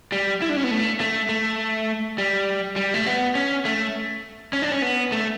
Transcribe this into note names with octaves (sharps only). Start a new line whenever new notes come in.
G3
E4
D4
C#4
B3
A3
A3
A3
G3
G3
A3
B3
C#4
A3
C#4
D4
C#4
B3
A3